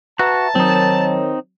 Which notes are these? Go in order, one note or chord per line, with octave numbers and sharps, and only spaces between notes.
F#4 B4 E5 A5 A#5
D#3 F#3 C4 D#4 C#5